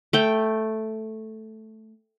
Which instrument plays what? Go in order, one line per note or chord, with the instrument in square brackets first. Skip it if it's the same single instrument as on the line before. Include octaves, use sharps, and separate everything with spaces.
[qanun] A3 G5